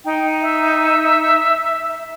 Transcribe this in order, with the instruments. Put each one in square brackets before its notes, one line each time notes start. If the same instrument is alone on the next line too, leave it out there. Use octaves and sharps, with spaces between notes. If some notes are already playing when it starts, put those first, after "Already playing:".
[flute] D#4 [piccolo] G5
[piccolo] E5